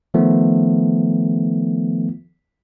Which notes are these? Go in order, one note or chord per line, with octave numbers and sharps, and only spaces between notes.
D#3 F3 A3 B3